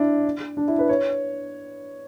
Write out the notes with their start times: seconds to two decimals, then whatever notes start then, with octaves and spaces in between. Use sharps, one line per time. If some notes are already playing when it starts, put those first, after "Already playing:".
Already playing: D4 E4
0.57 D4
0.68 E4
0.79 B4
0.89 C#5